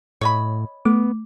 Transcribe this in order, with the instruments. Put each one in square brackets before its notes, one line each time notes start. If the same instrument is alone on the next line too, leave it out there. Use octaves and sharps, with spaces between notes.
[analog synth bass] A2 [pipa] C#5 D#5 B5
[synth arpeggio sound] A3 D6 [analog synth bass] B3